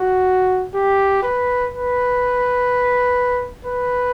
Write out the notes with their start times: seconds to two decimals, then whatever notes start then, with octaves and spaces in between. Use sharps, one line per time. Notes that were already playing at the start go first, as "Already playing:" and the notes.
Already playing: F#4
0.74 G4
1.22 B4
1.71 B4
3.65 B4